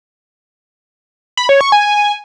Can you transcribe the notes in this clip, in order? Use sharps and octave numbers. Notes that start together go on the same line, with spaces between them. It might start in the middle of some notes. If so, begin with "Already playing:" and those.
B5
C#5
C#6
G#5